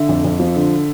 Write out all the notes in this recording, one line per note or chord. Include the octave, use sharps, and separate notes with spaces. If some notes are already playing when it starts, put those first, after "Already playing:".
Already playing: D3 E5
F2
F2
F3
D3